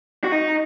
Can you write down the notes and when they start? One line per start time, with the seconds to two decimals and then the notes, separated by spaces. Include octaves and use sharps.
0.24 F#4
0.32 D#4